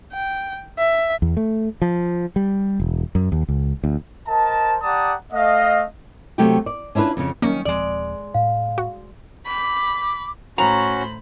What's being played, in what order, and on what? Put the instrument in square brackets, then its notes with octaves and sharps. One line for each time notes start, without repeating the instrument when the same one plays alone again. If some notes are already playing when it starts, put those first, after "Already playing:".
[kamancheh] G5
E5
[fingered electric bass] E2
A3
F3
G3
E1
F#2
D#2
C#2
D2
[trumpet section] A#4 C5 D#5 A5
G4 D5 F#5 A5 A#5 D#6
A3 D#5 F5
[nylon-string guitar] C3 F#3 A3 F#4 G4 G5
D5
C#4 D4 E4 F4 B4
F2 C#3
[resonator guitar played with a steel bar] D#3 C#4 [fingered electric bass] F#3 G3 C4 [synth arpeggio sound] A#3
[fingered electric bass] D#1 F3 C4 [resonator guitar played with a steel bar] G#3 D5
[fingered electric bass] A2 [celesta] F5
[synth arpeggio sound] F#4
[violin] B5 [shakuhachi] D6
[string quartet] A2 C5 B5 [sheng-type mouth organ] C#4 F#4 [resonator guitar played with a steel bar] A#5